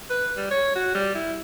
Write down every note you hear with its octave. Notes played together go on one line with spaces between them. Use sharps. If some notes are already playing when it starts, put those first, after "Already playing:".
B4
G3
C#5
F#4
G3
E4